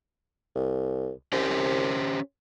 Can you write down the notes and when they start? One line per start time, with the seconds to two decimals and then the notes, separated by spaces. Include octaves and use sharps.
0.55 C2
1.33 C2 C#4 G4 C5